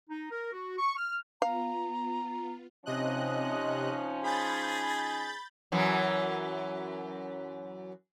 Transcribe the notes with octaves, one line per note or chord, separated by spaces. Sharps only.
D#4
A#4
F#4
C#6
F6
B3 F4 F5 A#5
C3 F3 C#4 D#4 D#5 F#6
G#4 B5 G6 A6
F#2 E3 F#3